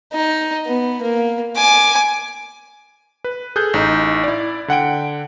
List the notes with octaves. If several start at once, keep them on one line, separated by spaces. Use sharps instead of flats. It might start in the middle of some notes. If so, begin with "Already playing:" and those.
D#4
B3
A#3
G#5 D6
B4
G#4 A4 F#6 G6
A1 D#4
E4 D5
D3 F#5 G5 D7